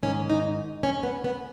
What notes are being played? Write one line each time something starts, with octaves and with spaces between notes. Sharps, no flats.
G#2 D#3 C#4
D#4
C#4
B3
B3